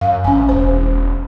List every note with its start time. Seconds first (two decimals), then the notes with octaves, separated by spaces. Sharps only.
0.01 F#2 F5
0.24 A1 C#4 G#5
0.49 E1 C5